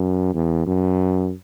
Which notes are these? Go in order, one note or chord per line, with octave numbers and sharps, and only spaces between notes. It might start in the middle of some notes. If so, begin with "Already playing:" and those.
Already playing: F#2
E2
F#2